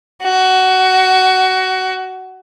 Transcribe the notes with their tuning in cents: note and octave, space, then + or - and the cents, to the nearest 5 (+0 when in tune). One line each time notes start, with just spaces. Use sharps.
F#4 +15